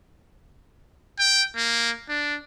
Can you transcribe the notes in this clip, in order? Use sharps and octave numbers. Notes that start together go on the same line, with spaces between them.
G5
A#3
D4